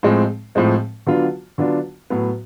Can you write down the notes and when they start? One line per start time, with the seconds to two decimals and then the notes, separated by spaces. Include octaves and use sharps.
0.03 A2 F3 G#3 C4
0.55 A2 F3 G#3 C4
1.07 D3 F#3 B3 D4 F4
1.58 D3 F#3 B3 D4 F4
2.10 A2 F#3 B3